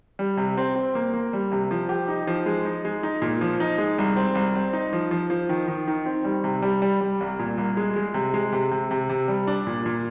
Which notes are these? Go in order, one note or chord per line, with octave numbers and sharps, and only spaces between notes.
G3
C3
C4
C4
A#3
A#3
G3
C3
F3
G4
D#4
F3
G#3
D#4
G#3
D#4
A#2
F3
D#4
G#3
C2
C4
C2
C4
D#4
F3
F3
F3
D#3
D#3
D#3
C4
G3
C3
G3
G3
G3
C2
A#2
C2
G#3
G#3
C3
G#3
C3
C3
C3
C3
G3
D4
A#2
A#2